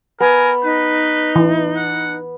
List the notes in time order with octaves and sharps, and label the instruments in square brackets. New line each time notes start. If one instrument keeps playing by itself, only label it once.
[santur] B3 [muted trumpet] A#4 [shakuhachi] G#5
[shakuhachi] D#4 [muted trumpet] B4
[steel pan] E3
[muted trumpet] F#5